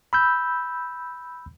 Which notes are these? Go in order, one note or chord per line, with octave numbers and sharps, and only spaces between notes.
B5 E6 G6